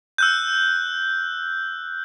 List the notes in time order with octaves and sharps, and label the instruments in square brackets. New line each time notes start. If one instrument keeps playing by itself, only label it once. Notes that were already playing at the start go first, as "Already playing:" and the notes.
[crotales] E6 F#6 G6